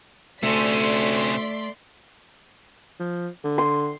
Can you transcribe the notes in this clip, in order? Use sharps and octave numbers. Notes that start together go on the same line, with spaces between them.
D2 C3 A3 C#4 D5 C6 B6
F3
D3
C6